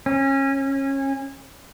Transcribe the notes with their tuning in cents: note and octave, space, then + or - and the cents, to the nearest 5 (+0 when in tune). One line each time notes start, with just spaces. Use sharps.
C#4 -25